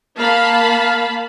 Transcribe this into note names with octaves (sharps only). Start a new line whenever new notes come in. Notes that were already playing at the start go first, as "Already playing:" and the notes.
A#3 F5 A5 B5